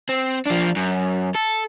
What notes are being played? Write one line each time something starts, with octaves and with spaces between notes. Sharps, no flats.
C4
F3 D4
F#2
A4